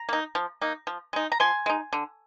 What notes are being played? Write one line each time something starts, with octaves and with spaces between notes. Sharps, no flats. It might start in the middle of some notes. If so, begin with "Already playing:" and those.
Already playing: A#5
A#3 D#4
F3
A#3 D#4
F3
G#3 D#4
A#5
F3 G#5 C6
G#3 D#4
D3